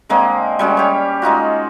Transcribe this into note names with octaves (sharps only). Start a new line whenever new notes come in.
D3 G#3 A#3 C4
G3 G#3 C#4 F#4
G4 C#5
G#3 D#4 F4 F#4